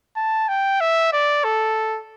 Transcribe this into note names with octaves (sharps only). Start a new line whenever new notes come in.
A5
G5
E5
D5
A4